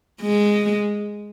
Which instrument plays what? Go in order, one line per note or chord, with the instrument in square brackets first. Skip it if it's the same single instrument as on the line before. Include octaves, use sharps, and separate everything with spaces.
[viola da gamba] G#3